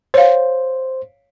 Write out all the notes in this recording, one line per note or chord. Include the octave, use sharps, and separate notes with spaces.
C5 C#5 F5